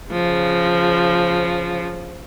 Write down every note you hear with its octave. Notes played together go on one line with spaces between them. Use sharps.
C#3 F3